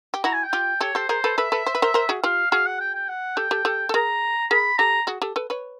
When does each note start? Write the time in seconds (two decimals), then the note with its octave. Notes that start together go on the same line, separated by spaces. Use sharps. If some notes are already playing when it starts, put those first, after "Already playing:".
0.14 G4
0.24 E4 F#4 A#5
0.33 G#5
0.43 G5
0.53 F4 G4
0.81 G4 A4 C#5
0.95 G4 A4 C5
1.09 G#4 A#4 C5
1.24 A4 B4
1.38 A4 B4 E5
1.52 A4 B4
1.66 C5
1.75 B4
1.82 A#4 C5
1.94 A#4 C5
2.09 F#4 G#4
2.23 F4 G4 F5
2.51 F#4 G#4 F5
2.66 F#5
2.81 G5
2.94 G5
3.09 F#5
3.36 G4 A4 G5
3.51 G4 A4
3.65 G4 A4
3.89 A4
3.94 G#4 A#4 A#5
4.51 G#4 A#4 B5
4.79 G4 A4 A#5
5.07 F#4 G#4
5.22 G4 A4
5.36 A4 B4
5.50 B4 C#5